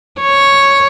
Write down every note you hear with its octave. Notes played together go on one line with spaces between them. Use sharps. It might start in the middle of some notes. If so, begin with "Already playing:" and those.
C#5